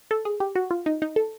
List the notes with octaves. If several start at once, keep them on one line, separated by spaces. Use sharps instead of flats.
A4
G#4
G4
F#4
F4
D#4
D#4
A4